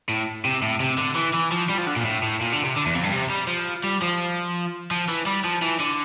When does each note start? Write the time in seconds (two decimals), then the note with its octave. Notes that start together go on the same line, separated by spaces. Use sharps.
0.09 A2
0.45 C3
0.62 A2
0.80 C3
0.98 D3
1.16 E3
1.34 E3
1.52 F3
1.70 G3
1.78 F3
1.87 D3
1.96 A#2
2.05 A2
2.23 A2
2.41 A#2
2.53 D3
2.64 C3
2.76 D3
2.86 E2
2.95 F2
3.04 G2
3.12 C3
3.30 G3
3.47 F3
3.84 G3
4.02 F3
4.91 F3
5.09 E3
5.27 G3
5.45 F3
5.62 E3
5.80 D3